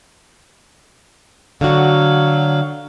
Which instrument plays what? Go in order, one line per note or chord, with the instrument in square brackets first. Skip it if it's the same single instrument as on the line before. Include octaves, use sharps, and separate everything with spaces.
[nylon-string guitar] D3 F#4 [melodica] F#3 F5